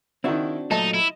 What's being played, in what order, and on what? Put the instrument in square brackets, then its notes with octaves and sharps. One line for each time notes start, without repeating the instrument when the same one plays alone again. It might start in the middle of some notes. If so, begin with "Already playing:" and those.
[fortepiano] D#3 E4 [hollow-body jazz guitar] C4 D4 F#4
[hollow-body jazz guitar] A#2 F#3 A3 [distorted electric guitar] D#4 [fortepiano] D#5 A5
[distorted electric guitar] E4